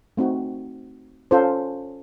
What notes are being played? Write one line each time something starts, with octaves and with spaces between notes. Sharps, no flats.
A3 C4 D#4 F#4
C#4 F4 A4 C5